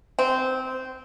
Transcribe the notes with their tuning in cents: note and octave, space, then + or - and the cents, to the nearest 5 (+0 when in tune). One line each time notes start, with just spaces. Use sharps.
C4 -15